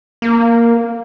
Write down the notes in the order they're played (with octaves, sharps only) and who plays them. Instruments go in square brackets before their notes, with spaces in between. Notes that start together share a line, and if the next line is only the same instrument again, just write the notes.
[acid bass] A#3